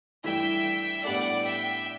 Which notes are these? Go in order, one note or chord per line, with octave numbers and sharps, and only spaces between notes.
G2 E3 A3 E4 E5 G5
A2 G3 B3 D4 A4 D5 F#5
E5 G5